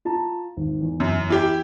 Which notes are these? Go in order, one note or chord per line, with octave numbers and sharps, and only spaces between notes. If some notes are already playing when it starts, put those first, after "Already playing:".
F4 A5 A#5
G#1
E2
F#2
E4 G4 G5